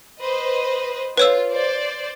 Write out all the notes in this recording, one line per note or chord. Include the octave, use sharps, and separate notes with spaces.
B4 C5 D#5
F4 B4 C#5 E6
C5 D5